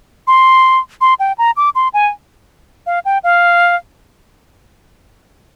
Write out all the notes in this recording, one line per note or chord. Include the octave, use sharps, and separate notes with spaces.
C6
C6
G5
A#5
D6
C6
G#5
F5
G5
F5